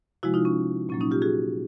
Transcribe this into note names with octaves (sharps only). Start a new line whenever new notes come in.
C3 F3 G#3 E4 F#4
D#4 F4
C#4
A#2 F#3 A#3 C#4
C#4 D#4
F4 G4
F#4 G#4